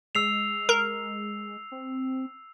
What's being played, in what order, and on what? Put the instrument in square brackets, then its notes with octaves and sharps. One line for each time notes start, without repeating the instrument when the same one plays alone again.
[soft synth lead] G#3 [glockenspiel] E6 C7 F7
[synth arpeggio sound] A#4
[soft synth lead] C4